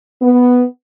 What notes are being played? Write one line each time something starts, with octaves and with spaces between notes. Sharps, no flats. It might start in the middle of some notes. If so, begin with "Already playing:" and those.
B3